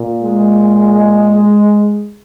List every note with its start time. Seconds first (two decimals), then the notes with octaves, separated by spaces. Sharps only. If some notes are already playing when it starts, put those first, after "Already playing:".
Already playing: A#2
0.23 G#3